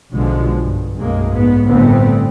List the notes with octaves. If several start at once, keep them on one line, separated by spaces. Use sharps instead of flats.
B1 B2 D3 F3 G#3
G2
B1 F#2 G#3 A#3
G#2 B3
G1 A2 D3 A3 B3 C4